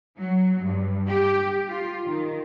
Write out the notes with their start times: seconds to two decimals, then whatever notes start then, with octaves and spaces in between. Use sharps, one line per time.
0.17 F#3
0.61 G2
1.08 G4
1.69 F4
2.06 D#3